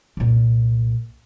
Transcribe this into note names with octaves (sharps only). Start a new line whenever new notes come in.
C2 A#2